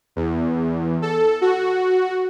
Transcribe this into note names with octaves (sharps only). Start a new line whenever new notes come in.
E2
A4
F#4